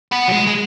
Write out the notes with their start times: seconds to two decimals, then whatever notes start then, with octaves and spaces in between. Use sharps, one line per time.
0.12 B3
0.29 F#3
0.32 G#3
0.47 G#3